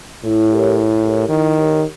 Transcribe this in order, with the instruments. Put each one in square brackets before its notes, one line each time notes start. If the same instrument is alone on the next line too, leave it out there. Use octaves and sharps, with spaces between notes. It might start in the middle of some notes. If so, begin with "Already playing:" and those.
[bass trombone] A2 [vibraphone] E4
[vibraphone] G4 A#4 C#5
E4
G4 A#4 C#5
[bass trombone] D#3 [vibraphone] E4
[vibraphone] G4 A#4 C#5